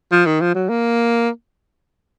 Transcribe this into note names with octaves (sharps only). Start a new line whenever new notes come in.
F3
D#3
F3
F#3
A#3